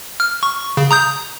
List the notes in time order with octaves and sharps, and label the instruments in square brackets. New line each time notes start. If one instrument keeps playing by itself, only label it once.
[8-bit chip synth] F6
C#6
C#3
A#5 D#6 G6